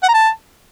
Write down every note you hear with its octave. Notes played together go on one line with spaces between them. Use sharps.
F#5
A#5
A5